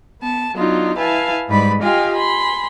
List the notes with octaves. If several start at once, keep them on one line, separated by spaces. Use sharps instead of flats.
B3 A5
F#3 B3 D4 D#4 F4
E4 B4 F5 G#5 A5
G#2 G3 D#4 B4 D5 B5
F4 G4 D#5 F5 G5 G#5
G#5 B5 C6